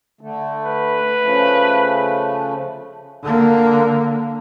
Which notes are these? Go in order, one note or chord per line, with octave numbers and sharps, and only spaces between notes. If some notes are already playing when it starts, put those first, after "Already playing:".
D3 A3
B4
C#3 F3 A3
D3 A#3